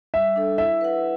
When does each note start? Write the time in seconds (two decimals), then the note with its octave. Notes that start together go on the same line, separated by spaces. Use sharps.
0.14 G3 E5
0.36 D4 A4
0.58 E4 E5
0.81 B4 F#5